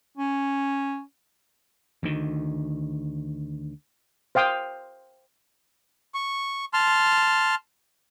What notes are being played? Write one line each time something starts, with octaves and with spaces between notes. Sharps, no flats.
C#4
D2 D#3
C5 F5 G5 D#6
C#6
A5 C6 F6